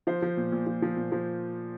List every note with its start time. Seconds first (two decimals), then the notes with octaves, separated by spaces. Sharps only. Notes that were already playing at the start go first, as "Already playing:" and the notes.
0.07 F3 C5
0.22 F3
0.37 A#2
0.52 A#2
0.67 F3
0.82 F3
0.96 A#2
1.12 F3